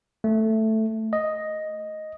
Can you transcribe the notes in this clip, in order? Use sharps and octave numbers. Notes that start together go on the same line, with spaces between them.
A3
D#5